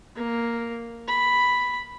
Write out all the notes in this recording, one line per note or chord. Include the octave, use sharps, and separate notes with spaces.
A#3
B5